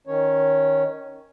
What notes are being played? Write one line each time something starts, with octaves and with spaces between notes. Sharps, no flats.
D#3 C#4 C#5